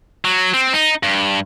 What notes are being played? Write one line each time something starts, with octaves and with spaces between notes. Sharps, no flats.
F#3
C4
D#4
G2